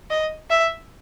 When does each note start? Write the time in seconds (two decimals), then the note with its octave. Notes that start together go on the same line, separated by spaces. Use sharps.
0.10 D#5
0.50 E5